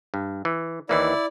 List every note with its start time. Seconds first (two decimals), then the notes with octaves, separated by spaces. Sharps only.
0.14 G2
0.45 E3
0.89 D#2 E3 A#3 E4 D5